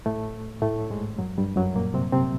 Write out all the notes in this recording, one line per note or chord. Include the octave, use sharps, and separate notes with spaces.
A2 A3
A2 A3
G#2 G#3
F#2 F#3
G2 G3
F#2 F#3
A#2 A#3
C3 C4
C3 C4